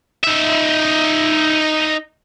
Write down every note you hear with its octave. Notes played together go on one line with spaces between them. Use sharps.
D#4 E5